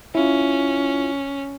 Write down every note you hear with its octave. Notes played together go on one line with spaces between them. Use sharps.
C#4 E4 F4